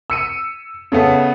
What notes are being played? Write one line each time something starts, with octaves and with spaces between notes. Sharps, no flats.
E6 C#7 D#7
C#3 A3 B3